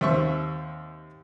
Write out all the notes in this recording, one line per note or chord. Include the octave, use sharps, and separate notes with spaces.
D#2 C4 E5 C#6